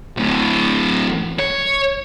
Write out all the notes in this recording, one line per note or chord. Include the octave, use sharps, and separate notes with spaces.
D2 A2
C#5